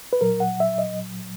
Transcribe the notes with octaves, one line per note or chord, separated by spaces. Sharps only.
B4
A#2 F#3 A#4
F#5
E5
D#5